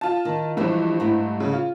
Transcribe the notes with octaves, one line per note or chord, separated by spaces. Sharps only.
F4 A5
D#3
G2 E3 F3 G#3 C5
G#2 A3 E4
C#3
F4